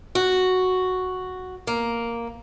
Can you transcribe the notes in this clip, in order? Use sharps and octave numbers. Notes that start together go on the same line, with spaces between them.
F#4
A#3